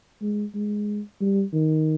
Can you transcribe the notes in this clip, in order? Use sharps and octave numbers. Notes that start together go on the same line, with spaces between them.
G#3
G#3
G3
D#3